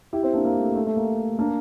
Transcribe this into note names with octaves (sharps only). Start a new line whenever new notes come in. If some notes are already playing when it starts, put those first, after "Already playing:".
E4 G4
C4 E4
A#3 D4
A#3
A3
A3
A3
A#3
A#3 D4